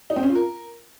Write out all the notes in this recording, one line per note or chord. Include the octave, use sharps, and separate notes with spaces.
D#4
C4
C#4
F4
A#4